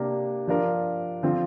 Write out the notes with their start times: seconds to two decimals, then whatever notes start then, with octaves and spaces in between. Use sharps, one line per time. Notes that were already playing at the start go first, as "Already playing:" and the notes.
Already playing: C3 A#3 D4 A#4
0.47 F3 D4 F4 A#4
1.23 D3 F3 C4 F4